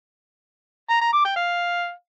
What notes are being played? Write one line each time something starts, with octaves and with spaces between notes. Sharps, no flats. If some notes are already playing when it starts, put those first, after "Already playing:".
A#5
A#5
D6
G5
F5